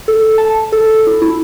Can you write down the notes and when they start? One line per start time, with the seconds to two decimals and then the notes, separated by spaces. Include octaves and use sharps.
0.08 A4
0.38 A5
0.72 A4
1.07 E4
1.22 E4